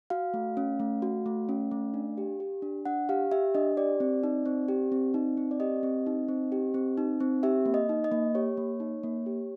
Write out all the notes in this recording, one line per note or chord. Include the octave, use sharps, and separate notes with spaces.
F#4 F5
A3
C#4
A3
F#4
A3
C#4
A3
D4
G4
G4
D4
D4 F#5
G4 F5
G4 E5
D4 D#5
G4 D5
C4
D#4
C4
G4
C4
D#4
C4
D5
G4 D#5
C4
D#4
C4
G4
C4
D#4
C4
G4 E5
A#3
D#5
D#4
D#5
A#3
G4 C#5
A#3
D#4
A#3
G4